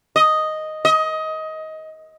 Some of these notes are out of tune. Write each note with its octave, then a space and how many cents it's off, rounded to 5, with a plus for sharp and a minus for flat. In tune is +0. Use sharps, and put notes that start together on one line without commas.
D#5 +0
D#5 +20